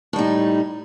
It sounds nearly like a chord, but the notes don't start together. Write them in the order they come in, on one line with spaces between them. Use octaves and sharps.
A2 G3 D#4